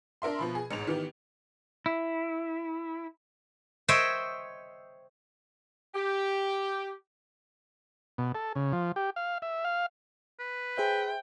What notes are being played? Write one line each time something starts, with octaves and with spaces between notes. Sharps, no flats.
D4 A#4 E5 C6
B2 F3 B5
G#4
A1 G#2 G#3 F7
D#3 E3 B3 G4
E4
C5 C#5 D#5 E5 G5
G4
B2
A4
C#3
F3
G4
F5
E5
F5
B4
G#4 C5 E5 G5